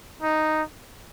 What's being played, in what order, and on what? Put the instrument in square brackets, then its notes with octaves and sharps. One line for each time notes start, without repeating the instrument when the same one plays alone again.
[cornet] D#4